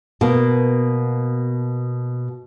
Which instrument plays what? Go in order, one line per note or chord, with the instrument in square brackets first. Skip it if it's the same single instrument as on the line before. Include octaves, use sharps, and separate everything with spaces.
[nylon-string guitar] B2 A#3